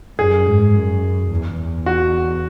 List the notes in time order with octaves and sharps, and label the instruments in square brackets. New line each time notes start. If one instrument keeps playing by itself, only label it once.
[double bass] F#2 [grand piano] G#4
[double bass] G#2
F#2
E2
E2
[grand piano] F#4